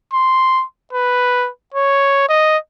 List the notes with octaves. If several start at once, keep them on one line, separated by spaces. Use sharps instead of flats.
C6
B4
C#5
D#5